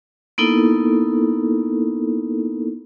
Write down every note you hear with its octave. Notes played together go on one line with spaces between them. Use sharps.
A#3 B3 D#4 E4 A4 A#4